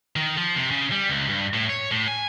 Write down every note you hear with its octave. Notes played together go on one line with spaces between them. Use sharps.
D#3
F3
C3
C#3
G3
C#2
G2
A2
C#5
A2
G#5